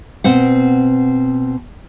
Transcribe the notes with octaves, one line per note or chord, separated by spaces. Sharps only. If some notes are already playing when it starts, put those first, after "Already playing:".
B2 C4 F#5